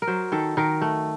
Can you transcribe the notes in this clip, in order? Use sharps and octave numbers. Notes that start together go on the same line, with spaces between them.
A#4
F#3 C5
D#3 A4
D#3 A#4
A3